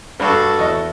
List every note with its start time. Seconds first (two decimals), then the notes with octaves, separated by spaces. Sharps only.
0.20 G2 F#4 A4
0.59 E2 D#5